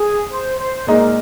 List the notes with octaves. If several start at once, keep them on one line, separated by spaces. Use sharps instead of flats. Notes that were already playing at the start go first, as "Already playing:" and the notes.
Already playing: G#4
C5
C5
A#2 G#3 D#4 A#4